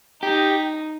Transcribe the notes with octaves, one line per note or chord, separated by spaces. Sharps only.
D#4 G4